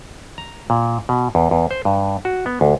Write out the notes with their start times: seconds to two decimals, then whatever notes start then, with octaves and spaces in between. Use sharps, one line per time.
0.38 A#5
0.70 A#2
1.09 B2
1.35 E2
1.51 E2
1.71 C5
1.85 G2
2.25 F#4
2.46 B3
2.61 D2